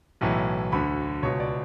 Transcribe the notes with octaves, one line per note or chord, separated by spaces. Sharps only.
B1 A2 E3
D2 D3 B5
C#2 B2 C#5
D5